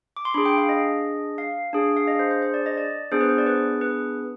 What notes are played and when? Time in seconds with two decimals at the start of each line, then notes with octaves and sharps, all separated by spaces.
0.17 D6
0.25 C6
0.34 D4 G#4 B5
0.45 G5
0.57 F5
0.69 D#5
1.38 F5
1.73 D4 G#4
1.97 F5
2.07 D#5
2.19 C5
2.31 C5
2.42 C5
2.54 D5
2.66 D#5
2.78 D5
3.11 B3 D4 G#4 C5
3.21 B4
3.29 C5
3.38 D5
3.47 B4
3.81 B4